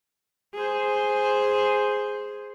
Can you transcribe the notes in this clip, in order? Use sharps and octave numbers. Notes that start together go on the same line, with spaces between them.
G#4 C5